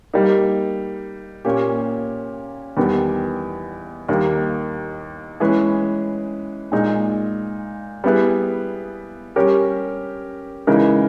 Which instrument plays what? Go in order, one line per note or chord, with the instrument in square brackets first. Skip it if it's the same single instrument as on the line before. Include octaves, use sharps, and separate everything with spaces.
[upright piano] G3 A#3 D#4
A#2 A#3 C#4 G4
E2 D#3 G3 B3
D#2 D#3 G3 A#3
E3 G#3 C#4 G#4 B4
A#2 G#3 D#4
G3 B3 E4 G#4 B4
G3 C#4 G4 A#4 C#5
C#3 E3 G#3 D#4 A#4